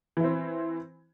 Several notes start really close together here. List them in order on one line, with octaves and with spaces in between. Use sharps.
E3 E4 C4